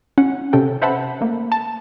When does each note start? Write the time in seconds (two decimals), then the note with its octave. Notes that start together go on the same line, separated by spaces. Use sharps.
0.18 C#4 F#5
0.53 C3 C#4 A4 G5
0.82 B4 C5 E5 F#5 A5 B5
1.21 A3 A#3
1.52 A5